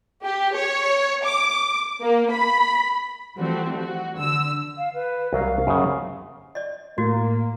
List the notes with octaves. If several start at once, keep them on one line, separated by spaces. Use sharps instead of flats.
G4
C#5
D6
A#3
B5
E3 F3 G3 A3 C4 F#4
F#4
D3 E6
F5
B4
C2 F#3 A#4 F5
F#2 C#3
D5 D#5
A2 A#3 F#4